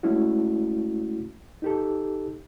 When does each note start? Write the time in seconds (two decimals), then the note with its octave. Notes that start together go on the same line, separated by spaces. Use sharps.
0.03 G#3 A3 C#4 E4 F#4
1.62 D#4 G4 A4